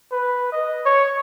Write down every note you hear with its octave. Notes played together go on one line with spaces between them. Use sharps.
B4
D#5
C#5